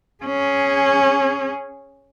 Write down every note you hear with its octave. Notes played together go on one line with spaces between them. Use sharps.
C#4 G#4